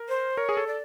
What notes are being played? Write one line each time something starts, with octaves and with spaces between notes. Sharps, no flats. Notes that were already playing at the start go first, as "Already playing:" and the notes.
Already playing: A#4
C5
A#4 C#5
G#4
A4
D5